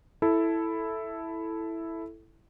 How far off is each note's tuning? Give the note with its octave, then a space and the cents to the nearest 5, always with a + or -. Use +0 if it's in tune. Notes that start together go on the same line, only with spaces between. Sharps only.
E4 +0 A4 +0